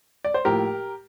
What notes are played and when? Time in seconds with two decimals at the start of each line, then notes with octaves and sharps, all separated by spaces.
0.24 D5
0.34 C5
0.45 A2 F3 A#3 G4 A#4